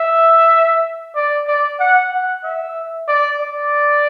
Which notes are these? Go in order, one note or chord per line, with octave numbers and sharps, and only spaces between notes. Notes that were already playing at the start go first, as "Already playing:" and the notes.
Already playing: E5
D5
D5
F#5
F#5
E5
D5
D5